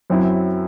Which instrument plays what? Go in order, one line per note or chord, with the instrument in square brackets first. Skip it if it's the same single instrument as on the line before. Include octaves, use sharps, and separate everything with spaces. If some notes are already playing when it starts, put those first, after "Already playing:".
[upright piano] F#2 F#3 C4 E4